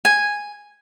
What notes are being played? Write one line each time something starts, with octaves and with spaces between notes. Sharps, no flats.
G#5